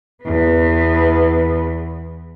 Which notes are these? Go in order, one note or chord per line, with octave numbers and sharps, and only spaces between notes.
E2 B3